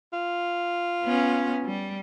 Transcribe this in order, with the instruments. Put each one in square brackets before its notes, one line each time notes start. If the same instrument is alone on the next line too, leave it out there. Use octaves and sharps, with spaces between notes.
[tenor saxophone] F4
[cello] B3 C#4
G3